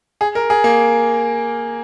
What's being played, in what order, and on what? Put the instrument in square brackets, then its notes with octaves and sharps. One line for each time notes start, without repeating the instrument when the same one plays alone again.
[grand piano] G#4
A#4
G#4
A#3